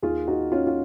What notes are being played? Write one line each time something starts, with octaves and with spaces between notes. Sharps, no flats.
D#2 D#3 F4 G#4
D#4 F#4
C#4 F4
F4